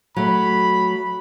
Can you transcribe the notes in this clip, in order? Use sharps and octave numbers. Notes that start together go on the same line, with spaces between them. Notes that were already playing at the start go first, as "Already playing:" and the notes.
F#3 A3 B5